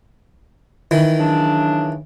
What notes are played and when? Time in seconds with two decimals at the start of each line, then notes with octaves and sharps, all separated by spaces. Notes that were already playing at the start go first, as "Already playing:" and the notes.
0.91 D#3 E3
1.19 C#3 F#3 D4